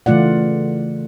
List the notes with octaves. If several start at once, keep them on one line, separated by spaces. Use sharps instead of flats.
C#3 E3 A3 F4 D5 F#5